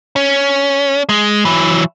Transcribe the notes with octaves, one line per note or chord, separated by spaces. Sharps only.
C#4
G#3
E3 F#3